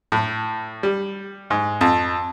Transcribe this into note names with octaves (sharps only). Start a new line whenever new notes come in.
A2
G3
G#2
F2